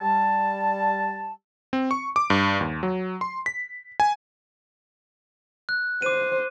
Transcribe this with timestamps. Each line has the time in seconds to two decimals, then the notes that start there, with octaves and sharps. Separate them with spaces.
0.01 G3 A5
1.73 C4
1.91 C#6
2.16 D6
2.30 G2
2.61 D#2
2.83 F#3
3.21 C6
3.46 B6
4.00 G#5
5.69 F#6
6.02 C5 D6 D#7